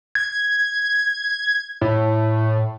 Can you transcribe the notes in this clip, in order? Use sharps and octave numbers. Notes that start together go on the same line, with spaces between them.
G#6
A2